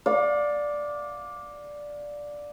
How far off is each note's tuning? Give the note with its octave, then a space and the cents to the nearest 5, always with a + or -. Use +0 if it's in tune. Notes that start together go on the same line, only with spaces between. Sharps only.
D5 +0 F5 +35